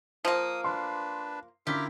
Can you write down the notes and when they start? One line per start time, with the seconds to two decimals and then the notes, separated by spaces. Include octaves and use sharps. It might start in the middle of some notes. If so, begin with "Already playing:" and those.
0.25 F3 A#3 D#6
0.64 D4 B4 C6
1.67 D3 C#4 E4 F4 G4 A#4 B6